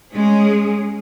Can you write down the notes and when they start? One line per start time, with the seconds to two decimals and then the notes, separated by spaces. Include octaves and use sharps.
0.13 G#3 C#4 G#4